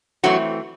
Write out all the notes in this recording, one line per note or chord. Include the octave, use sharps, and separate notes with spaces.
E3 F#3 A3 C4 F#4